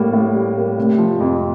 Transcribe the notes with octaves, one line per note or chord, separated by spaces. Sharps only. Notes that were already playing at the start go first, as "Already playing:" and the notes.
Already playing: A2 G3 A#3
A2
G3
A#3
C3
F3
F2